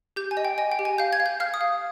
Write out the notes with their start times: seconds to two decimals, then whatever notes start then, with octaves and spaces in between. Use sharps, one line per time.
0.16 G4 G6
0.31 G#5
0.37 D#5
0.45 G5
0.58 D#5 G#5
0.72 G5
0.79 G4
0.85 G#5
0.98 F5 G6
1.13 G#6
1.20 F5
1.26 G6
1.40 F5 F6
1.54 D#6
1.61 F5